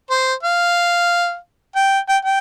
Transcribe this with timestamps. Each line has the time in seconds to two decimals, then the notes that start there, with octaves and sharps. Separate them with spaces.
0.10 C5
0.43 F5
1.76 G5
2.09 G5
2.25 G5